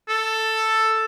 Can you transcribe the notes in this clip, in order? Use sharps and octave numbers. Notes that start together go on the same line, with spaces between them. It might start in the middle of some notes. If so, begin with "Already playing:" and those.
A4